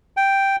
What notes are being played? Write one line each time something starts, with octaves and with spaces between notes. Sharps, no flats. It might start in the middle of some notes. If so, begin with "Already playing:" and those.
G5